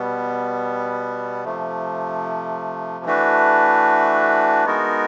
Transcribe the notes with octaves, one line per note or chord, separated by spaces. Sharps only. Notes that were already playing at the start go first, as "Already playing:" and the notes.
Already playing: B2 G3 B3
C3 F3 A3
E3 A3 D4 F#4 B4
G#3 B3 D#4 F#4 A#4